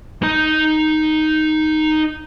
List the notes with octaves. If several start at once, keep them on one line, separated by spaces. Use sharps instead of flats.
D#4 A#5